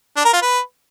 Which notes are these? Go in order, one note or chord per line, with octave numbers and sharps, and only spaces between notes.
D4
A#4
F4
B4